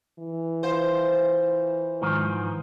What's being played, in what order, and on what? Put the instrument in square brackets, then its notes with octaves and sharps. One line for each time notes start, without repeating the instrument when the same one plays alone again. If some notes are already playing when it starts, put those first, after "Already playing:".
[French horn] E3
[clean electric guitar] F4 [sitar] C5
[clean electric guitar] G#2 D#3 F3